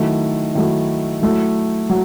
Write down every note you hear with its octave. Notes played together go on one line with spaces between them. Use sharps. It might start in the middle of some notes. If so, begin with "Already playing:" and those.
Already playing: D#3 F#3 A3 E4
D#3 F#3 A3 E4
F#3 A3 E4
F#3